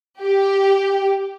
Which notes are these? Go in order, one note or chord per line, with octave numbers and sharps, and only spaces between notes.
G4